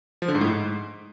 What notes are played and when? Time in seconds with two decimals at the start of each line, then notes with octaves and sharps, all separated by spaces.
0.22 F3
0.28 D3
0.35 G#2
0.41 A2
0.48 G#2